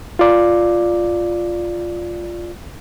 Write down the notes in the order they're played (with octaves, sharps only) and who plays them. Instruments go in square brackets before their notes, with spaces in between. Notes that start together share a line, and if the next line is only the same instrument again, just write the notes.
[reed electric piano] F4 D5